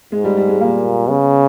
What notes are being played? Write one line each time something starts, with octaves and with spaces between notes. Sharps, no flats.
G#2 G#3
G3
G3
G#3
A#2 A#3
C#3 B3